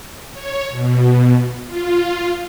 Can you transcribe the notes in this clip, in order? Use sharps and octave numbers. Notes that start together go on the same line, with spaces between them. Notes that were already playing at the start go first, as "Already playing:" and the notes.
C#5
B2
F4